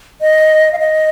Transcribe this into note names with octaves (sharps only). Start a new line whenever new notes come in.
D#5
F5
D#5